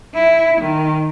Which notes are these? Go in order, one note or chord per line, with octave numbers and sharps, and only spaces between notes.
E4
D#3